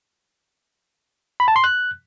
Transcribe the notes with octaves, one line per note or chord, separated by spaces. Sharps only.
B5
A5
C6
F#6